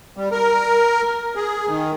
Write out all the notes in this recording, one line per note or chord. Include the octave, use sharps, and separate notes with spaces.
G3
A#4
G#4
D#3